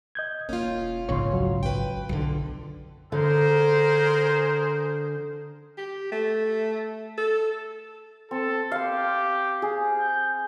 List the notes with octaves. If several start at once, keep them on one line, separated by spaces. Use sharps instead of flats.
D#5 G6 G#6
E1 A#3 C#4 F4
A#1 G#2 C#3 C#5 C6
D2 F#3
G#1 B4 G5
B1 F#2 D3 F4
D3 G#4 A#4 C5
G4
A3
A4
C4 A4
G4 F5 C6
G#4
G6